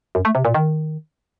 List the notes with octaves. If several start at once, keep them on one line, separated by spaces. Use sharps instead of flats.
F#2
A3
C3
A#2
D#3